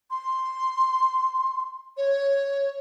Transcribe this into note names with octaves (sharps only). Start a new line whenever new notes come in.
C6
C#5